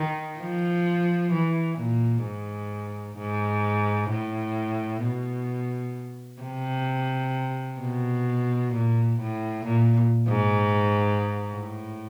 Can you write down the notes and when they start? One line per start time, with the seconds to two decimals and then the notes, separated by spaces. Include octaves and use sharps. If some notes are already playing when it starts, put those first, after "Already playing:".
Already playing: D#3
0.39 F3
1.32 E3
1.78 A#2
2.24 G#2
3.18 G#2
4.10 A2
5.03 B2
6.42 C3
7.80 B2
8.73 A#2
9.19 A2
9.66 A#2
10.28 G#2
11.52 A2